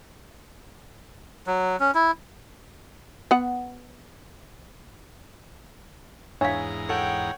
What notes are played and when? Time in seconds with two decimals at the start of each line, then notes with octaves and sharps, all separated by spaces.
1.47 F#3
1.80 C#4
1.95 E4
3.31 B3 F#5
6.41 E2 G#2 D4 C#5 E5 F5 A#5
6.89 A4 C#5 F#5 G5